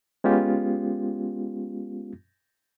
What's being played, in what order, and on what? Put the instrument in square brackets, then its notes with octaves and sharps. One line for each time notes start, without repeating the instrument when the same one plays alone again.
[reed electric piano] G#3 B3 C#4 F4 G4